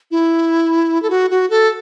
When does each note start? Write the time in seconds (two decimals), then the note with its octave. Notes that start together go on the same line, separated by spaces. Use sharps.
0.11 E4
1.03 A4
1.10 F#4
1.30 F#4
1.50 A4